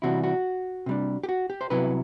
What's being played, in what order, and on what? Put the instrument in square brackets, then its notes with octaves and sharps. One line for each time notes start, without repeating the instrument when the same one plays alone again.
[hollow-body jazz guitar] C3 E3 G3 C4 E4 F#4
F#4
C3 G3 D4
G4
F#4
G4
C5
C2 C3 F#3 B3 E4 B4